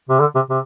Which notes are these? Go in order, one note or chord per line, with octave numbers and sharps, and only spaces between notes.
C3
D3
C3
C3